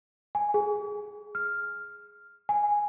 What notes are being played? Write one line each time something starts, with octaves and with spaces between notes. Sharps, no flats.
G#5
G#4
F6
G#5